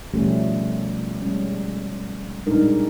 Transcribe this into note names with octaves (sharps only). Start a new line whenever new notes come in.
B2 F3 G3 A3 C#4 G4
G3 G#3 C#4
A#2 G3 G#3 D4 D#4 A#4